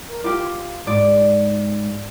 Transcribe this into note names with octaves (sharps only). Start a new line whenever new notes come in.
A#4
F4 G4 D6
C6
G#2 D5